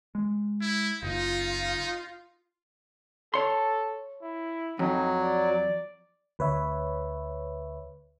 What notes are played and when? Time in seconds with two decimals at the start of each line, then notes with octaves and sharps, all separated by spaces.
0.15 G#3
0.61 E4
1.03 F#1 D#4 F4
3.34 A4 C#5 C6
4.23 E4
4.79 F2 F#3 D#4
5.22 D5
6.39 D2 B4 C#5 E5